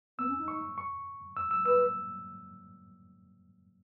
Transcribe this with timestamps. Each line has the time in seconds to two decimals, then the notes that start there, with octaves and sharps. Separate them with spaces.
0.18 B3 E6
0.28 C#4
0.38 D#4
0.48 C#6
0.78 C#6
1.37 E6
1.51 E6
1.66 B4 E6